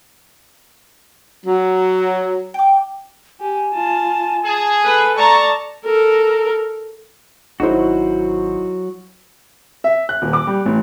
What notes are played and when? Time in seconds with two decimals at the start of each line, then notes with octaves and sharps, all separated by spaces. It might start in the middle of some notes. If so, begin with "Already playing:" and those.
1.46 F#3
2.54 G5 D6
3.41 G4 G#5
3.75 F4 A5
4.45 G#4 A5
4.84 A4 B4
5.18 D5 A5 A#5 C#6
5.85 A4 A#4
7.60 G#1 F#3 D#4 E4 F#4 C5
9.84 E5
10.09 F#6
10.22 D#1
10.33 D6
10.47 G3
10.66 A1